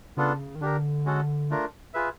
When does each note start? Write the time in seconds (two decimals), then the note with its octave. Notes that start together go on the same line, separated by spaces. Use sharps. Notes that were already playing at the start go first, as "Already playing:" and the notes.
0.17 C#3 B3 D4 F4 A4
0.55 D#3
0.61 D3 D4 G4 A#4
1.05 G#3 C#4 F#4 A4
1.50 A3 D4 F4 A#4
1.94 F4 G#4 B4 E5